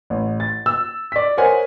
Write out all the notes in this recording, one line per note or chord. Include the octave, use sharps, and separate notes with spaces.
A1
A6
E6
D5 B6
A#4 C5 C#5 D#5 F#5 G#5